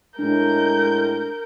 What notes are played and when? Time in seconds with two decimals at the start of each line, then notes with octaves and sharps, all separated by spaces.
0.19 A2 G#3 D4 A#4 G6